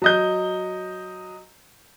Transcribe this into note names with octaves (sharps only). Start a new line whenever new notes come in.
F#3 D#5 G6